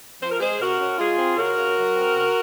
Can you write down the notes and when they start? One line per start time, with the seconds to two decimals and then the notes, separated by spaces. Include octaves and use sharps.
0.22 F3 C5
0.31 A#4
0.40 G#3 G#4 C5
0.60 C3 F#4 A#4
0.80 C#4
0.99 G#3 F4 G#4
1.18 C4
1.37 C#3 F#4 A#4
1.56 C#3
1.77 F#3
1.95 C4
2.14 C#3